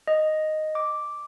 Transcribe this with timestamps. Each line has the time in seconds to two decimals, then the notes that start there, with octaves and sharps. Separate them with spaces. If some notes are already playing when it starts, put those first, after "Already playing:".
0.07 D#5
0.75 D6